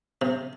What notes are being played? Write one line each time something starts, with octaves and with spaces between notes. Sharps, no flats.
C3